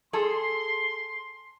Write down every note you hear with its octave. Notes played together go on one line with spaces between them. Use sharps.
G#4 A4 C6